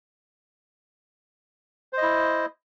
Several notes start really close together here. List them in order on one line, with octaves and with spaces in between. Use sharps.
C5 D#5 E4